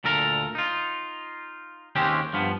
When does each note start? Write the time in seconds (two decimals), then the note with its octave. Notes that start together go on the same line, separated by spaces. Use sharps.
0.04 D2 A#2 A4 A#4 A#5
0.55 D#4 F4
1.95 D#2 G#3 C4 C#4 G4
2.33 G2 F3 B3